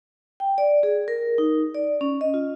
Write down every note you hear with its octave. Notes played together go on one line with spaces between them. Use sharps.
G5
D5
G#4
A#4
D#4
D5
C#4
D#5
F4